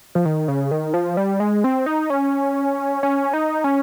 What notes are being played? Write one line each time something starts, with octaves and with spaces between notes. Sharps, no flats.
F3
D#3
C#3
D#3
F3
G3
G#3
C4
D#4
C#4
C#4
D#4
C#4